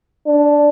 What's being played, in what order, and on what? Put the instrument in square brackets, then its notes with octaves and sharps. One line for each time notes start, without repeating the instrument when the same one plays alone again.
[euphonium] D4